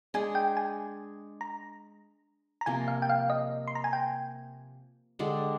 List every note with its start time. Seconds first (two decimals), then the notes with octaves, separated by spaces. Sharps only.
0.14 G#3 D4 G#4 G#5
0.35 G5
0.57 G#5
1.41 A#5
2.61 A#5
2.66 C3 F3 A#3 G#5
2.88 F5
3.02 G5
3.09 F5
3.30 D#5
3.68 C6
3.75 A#5
3.84 G#5
3.93 G5
5.19 D3 G#3 D4 G4